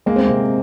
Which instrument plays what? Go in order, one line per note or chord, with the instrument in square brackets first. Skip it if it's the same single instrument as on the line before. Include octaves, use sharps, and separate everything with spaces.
[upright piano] G#3 [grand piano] A#3
[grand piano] C4
[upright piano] C3 [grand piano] A#3